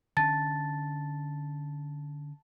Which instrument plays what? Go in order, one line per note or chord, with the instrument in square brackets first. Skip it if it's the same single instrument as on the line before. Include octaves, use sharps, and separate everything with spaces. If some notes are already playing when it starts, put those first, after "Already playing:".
[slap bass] D3 C#4 [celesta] A5 A6